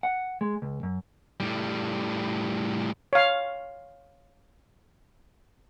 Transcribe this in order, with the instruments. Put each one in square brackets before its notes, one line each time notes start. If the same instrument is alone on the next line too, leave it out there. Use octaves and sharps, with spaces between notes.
[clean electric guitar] F#5
G#3
C#2
F#2
[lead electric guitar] A2 G3
[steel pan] C#5 F5